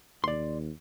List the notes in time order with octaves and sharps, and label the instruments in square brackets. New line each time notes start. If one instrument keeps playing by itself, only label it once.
[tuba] D#2 [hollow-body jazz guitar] D5 C6